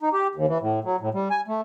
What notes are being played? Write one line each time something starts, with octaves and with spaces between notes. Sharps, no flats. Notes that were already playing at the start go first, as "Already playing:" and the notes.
D#4
G4
D#2
E3
A2
F#3
A2
G3
G#5
A3